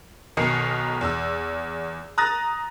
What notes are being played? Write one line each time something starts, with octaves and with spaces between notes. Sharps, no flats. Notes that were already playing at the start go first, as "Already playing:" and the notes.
B1 B2 D#3 A#4 C7 C#7
E2 E6
A#5 D#6 F#6 A6 A#6